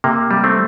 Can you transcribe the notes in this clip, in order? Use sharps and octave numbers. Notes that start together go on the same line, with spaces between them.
C3 A#3
G3
A3 C4